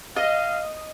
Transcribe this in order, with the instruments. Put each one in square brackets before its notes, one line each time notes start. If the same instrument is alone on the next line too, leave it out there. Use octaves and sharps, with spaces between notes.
[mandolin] D#5 [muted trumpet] F5